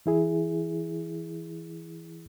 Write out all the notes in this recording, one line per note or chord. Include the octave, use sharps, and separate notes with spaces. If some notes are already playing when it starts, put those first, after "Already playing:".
E3 E4 G#4